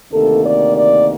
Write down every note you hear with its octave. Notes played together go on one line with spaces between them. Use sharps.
D2 C3 D#3 A#3 A4
D5
D5